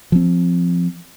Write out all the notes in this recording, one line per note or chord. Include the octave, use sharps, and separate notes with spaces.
F3 C4